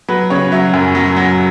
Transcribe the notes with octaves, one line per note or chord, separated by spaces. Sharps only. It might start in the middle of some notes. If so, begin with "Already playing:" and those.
F#3 B4
C#3 C#5
F#3 E5
F#2
F#3
F#3